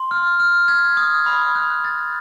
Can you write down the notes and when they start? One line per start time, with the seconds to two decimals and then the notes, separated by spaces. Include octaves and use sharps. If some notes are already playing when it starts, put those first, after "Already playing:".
Already playing: C6
0.11 F6
0.40 F6
0.68 G#6
0.97 D#6
1.26 B5
1.55 F#6
1.84 A6